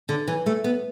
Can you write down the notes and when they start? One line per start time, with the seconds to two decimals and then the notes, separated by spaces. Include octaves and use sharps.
0.09 D3
0.28 E3
0.46 A3
0.64 B3